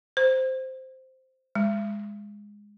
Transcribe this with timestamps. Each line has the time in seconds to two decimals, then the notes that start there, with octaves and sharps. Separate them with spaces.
0.17 C5
1.55 G#3